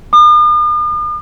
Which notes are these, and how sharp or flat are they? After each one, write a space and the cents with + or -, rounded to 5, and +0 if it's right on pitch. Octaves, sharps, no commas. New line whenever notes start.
D#6 -45